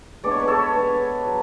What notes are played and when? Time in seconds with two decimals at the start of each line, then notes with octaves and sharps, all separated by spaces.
0.24 G#3 B3 D4 D5
0.31 C#5
0.40 B4
0.48 A4 C#5
0.75 G#3 B3 D4
1.27 F#3